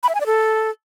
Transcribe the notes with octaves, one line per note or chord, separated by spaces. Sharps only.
B5
E5
G#5
D5
A4